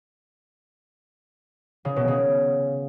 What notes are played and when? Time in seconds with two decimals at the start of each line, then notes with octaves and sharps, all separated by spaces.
1.85 C#3
1.96 B2
2.08 C#3